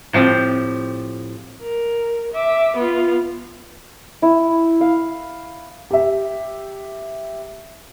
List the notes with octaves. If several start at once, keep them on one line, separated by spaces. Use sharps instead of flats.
A2 F3 C4 G4
A#4
E5 D6
B3 F4
E4
F5
G4 E5